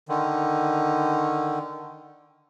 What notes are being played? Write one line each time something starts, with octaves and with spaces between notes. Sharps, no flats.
D3 D#3